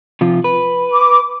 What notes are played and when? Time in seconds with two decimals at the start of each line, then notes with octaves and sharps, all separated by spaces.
0.21 C3 F3 F4
0.44 B4
0.91 D6